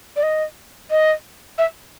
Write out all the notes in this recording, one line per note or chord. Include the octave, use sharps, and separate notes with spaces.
D5
D#5
D#5
E5